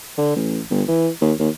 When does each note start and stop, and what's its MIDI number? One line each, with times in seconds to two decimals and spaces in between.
0.18 0.34 50
0.36 0.60 33
0.70 0.83 31
0.88 1.09 52
1.21 1.33 39
1.39 1.49 39